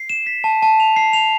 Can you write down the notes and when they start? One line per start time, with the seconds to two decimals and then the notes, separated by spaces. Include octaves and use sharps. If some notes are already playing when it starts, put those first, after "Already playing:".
Already playing: C7
0.10 E7
0.26 B6
0.44 A5
0.62 A5
0.80 F7
0.96 C7
1.13 F7